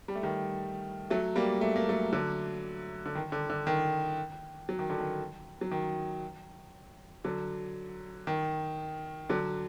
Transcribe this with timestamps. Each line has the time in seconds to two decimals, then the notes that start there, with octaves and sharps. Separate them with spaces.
0.08 G3
0.15 A3
0.23 D#3 G3
1.10 F#3 A3
1.36 G3 A#3
1.61 A3
1.76 A#3
1.89 F#3 A3
2.13 D3 F#3
3.06 D3
3.15 D#3
3.32 D3
3.50 D3
3.67 D#3
4.69 F#3
4.79 D#3
4.90 D3
5.00 D#3
5.61 F#3
5.71 D#3
7.24 D3 F#3
8.27 D#3
9.29 D3 F#3